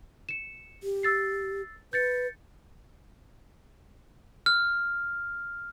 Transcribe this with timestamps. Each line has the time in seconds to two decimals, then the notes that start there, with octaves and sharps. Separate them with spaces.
0.29 C#7 E7
0.83 G4
1.03 E6 A6 C7
1.93 B4 G6 A6 C#7
4.46 F6